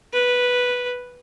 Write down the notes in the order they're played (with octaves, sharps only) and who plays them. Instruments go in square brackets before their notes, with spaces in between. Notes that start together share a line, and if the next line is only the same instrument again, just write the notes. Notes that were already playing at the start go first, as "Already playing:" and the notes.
[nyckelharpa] B4